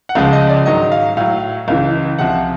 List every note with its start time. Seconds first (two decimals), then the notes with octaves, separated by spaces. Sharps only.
0.09 F#5
0.15 C#2 C#3 F3 G#3 F5
0.33 D#5
0.49 D5
0.66 G#2 D#3 F#3 D#5
0.92 F5
1.17 A2 F#3 F5
1.68 C#2 C#3 E3 F5
2.18 C2 C3 F3 F#5